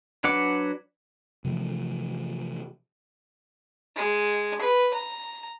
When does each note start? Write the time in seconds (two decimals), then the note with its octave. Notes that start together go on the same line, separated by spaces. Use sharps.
0.24 F#3 D4 B4 F#5 D6
1.44 C3 E3 F3 A3
3.96 G#3
4.61 B4
4.94 A#5